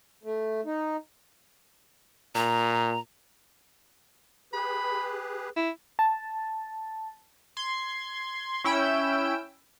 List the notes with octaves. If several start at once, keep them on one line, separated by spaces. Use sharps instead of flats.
A3
D#4
A#2 A#5
G4 G#4 B4 B5
E4
A5
C6 G#6
C#4 E4 G5 E6 D7